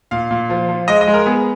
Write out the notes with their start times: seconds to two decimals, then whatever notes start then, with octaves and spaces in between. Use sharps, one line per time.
0.11 A#2 F5
0.31 A#2
0.50 F3
0.69 F3
0.88 G#3 D#5
1.01 D#5
1.07 G#3
1.14 A#4
1.26 B3 G#4